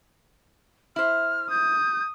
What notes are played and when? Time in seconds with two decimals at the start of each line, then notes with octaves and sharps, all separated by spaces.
0.96 E4 C5 F6
1.50 D#6 G6